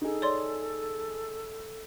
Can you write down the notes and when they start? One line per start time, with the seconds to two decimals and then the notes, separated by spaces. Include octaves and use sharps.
0.02 D#4 G#4 A4
0.22 C#5 D5 C6